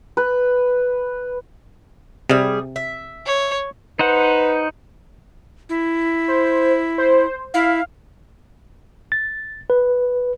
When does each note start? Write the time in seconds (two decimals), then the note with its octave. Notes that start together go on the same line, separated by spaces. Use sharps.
0.17 B4
2.30 C3 G3 G#4
2.76 E5
3.26 C#5
3.99 D#4 B4 C5 F#5
5.69 E4
6.28 C5
6.98 C5
7.54 E4 F5
9.12 A6
9.70 B4